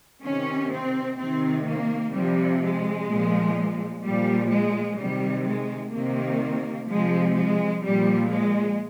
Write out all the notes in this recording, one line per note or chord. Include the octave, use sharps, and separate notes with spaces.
C3 D#3 C#4
C4
C3 D#3 C4
A#3
C3 F3 G3
G#3
A#2 F3
A#2 F3 G3
G#3
C3 D#3 G3
G#3
C3 D#3 A#3
C3 F3 G#3
G#3
A#2 F3 G3
G#3